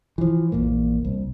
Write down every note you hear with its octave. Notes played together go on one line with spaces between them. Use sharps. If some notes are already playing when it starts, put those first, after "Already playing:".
E3 F3
A#1 E2 A#2 A#3
C2